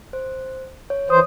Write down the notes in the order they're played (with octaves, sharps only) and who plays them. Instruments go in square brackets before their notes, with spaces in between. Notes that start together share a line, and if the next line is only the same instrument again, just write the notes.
[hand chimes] C5
C#5
[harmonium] E3 C5 [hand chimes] D#6